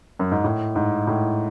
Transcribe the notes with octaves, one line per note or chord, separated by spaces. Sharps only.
F#2
G#2
A2
G#2
A2